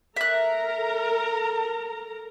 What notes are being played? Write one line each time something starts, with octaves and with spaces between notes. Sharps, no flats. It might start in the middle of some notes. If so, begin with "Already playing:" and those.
A4 A#4 E5 A#5 F#6